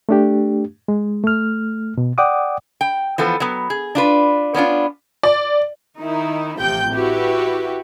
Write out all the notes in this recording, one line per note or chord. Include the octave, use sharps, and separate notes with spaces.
A3 D4 G4
G#3
A3 F6
B2
D5 F#5 G5 D6 D#6
G5
E3 F3 B3 A4
F#3 B3
G#4
D4 F4 B4
B3 C#4 D4 F4
D5
D#3 D#4 E4
A1 C3 F3 G5 G6
E4 F#4 G4 B4